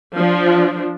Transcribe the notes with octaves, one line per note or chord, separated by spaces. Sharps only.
F3 D4